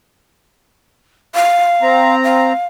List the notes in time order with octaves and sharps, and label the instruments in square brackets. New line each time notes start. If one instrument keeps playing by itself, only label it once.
[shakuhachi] F5
[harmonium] C4 A#5
[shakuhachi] F5